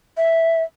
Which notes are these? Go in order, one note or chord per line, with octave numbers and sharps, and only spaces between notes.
E5